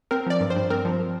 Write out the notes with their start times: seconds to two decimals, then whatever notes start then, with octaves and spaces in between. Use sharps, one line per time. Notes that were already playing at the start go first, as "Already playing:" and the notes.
0.11 C4 A#4
0.27 F3 D5
0.41 G2
0.50 C5
0.56 G2
0.70 C4 A#4
0.85 F3